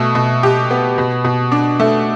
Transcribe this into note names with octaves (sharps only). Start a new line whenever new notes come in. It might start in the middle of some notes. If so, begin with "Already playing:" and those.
Already playing: B2 A3
B2
G4
B3
B2
B2
D4
A3